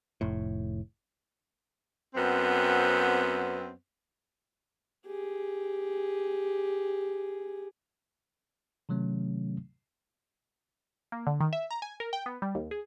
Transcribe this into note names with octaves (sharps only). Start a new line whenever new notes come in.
F1 A2
F#2 B3 C4
G4 G#4
C3 D#3 F#3 A3 C#4
A#3
D3
D#3
E5
A#5
G#5
A#4
G5
B3
G3
D#2
G#4